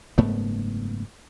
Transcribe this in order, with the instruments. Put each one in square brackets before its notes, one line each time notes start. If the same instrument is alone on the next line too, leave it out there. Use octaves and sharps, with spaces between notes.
[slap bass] F#1 G#2 A3 B3